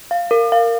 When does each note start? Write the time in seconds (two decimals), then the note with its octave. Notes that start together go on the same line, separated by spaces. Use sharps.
0.11 F5
0.31 A#4
0.52 F5